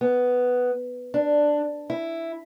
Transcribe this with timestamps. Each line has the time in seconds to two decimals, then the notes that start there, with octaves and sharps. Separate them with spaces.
0.01 B3
1.14 D4
1.90 E4